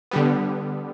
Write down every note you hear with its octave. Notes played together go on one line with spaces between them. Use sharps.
D3 G3 B3